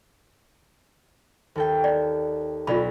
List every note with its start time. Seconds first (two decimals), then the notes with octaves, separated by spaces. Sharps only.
1.55 D#2 A4 G5
1.84 D5
2.67 B1 F4 D5 B5